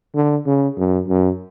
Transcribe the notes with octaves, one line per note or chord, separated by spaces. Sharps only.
D3
C#3
F#2
F#2